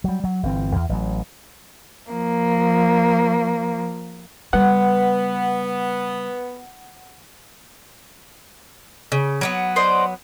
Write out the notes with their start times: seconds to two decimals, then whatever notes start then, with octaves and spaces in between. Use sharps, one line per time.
0.04 F#3 G3
0.24 F#3
0.43 G1 E3 C4
0.76 E2
0.89 A1 F#3
2.11 F3 A#3
4.53 C#3 G3 B3 F#5
9.12 C#3
9.41 F#3 A#3 B3
9.76 C5 D5 D#5